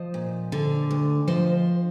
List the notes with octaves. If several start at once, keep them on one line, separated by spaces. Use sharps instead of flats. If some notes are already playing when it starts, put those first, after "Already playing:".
Already playing: F3 C5 D#5
A#2
D3
D2
F3 C5 D#5